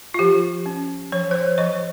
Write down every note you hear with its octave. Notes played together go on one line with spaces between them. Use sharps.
F4
F3 G4
C#4
F3 C#5
C5
C#5
F3 D#5